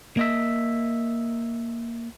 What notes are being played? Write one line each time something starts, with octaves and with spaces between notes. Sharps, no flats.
A#3 D#5 E5